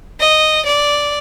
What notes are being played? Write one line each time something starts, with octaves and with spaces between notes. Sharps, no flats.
D#5
D5